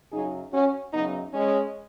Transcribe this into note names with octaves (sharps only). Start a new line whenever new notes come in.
F#2 C#3 F#3 D#4 G#4
C#4 F#4
F#2 C#3 F#3 B3 D#4
G#3 C#4